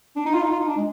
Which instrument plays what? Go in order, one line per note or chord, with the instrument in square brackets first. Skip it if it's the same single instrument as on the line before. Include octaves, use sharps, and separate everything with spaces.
[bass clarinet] D4
D#4
F4
D#4
F4
D#4
D4
G#3